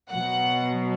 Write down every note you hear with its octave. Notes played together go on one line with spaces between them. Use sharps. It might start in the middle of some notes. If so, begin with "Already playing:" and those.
B2 F#3 F#5